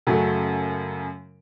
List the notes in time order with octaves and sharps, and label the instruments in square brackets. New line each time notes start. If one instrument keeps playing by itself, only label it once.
[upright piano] F#2 C#3 F#3 A3